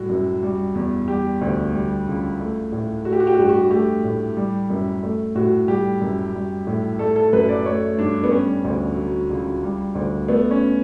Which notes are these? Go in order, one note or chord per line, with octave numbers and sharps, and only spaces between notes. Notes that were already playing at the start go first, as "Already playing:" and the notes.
Already playing: A2 G3 F#4
F#2
G3
E2
G3 G4
D2
G3
C#2
A3
A2
A3 F#4
G4
F#4
G4
F#4
G2 G4
F#4
A3 G4
A2
G3
F#2
A3
A2 F#4
G3 G4
F#2
G3
A2
A3 A4
A4
F#2 B4
D5
A3 C#5
G2 D4
B3
G3 C#4
D2
F#3
C#2
G3
D2
A3 B3
C#4